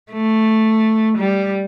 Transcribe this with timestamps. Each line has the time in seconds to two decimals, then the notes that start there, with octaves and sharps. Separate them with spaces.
0.12 A3
1.18 G3